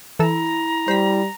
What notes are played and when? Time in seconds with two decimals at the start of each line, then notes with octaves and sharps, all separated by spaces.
0.19 E3 E4 A4 A#5 E6
0.88 G3 C5 B6